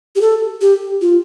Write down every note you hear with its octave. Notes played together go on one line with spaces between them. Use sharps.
G4
A4
G4
F4